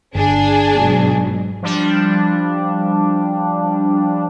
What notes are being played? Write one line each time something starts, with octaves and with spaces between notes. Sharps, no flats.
G1 D4 G#4
G#2 B2 F#3
F3 G3 D4